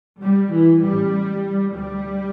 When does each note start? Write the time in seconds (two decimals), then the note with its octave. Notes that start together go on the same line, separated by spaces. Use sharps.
0.22 G3
0.52 E3
0.82 A1 A2 G3
1.75 D2 G3